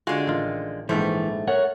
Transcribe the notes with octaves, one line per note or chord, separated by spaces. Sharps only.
D3 G#3 F4 F#4 F5
A1 D#3 F4
A#1 G#2 E3 A3 C5
A#4 C#5 F#5